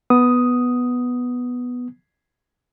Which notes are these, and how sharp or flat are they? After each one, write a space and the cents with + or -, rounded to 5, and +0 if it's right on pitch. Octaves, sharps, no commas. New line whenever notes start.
B3 +0 D#6 +0